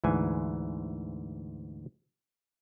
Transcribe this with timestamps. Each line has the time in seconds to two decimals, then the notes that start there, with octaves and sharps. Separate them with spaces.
0.04 D2 G#2 E3 G#5